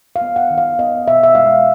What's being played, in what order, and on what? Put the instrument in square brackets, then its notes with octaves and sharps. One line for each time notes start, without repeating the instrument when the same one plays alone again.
[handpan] F5
B3
F#5
D#3
F5
B3 D#5
B2 E5
E5
G#3 F5